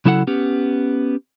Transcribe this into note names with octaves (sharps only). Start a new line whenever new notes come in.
C#3 F#3 E4 A4 D5 F#5
B3 C#4 G4